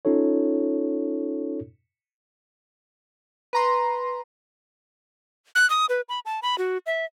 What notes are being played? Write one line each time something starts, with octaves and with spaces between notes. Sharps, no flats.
C#4 D#4 F4 A4 C#5
B4 A#5 C6
F#6
D#6
B4
B5
A5
B5
F#4
E5